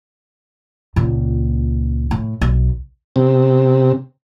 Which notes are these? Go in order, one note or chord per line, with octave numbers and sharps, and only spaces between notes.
C#2 A#2
A2
B1
C3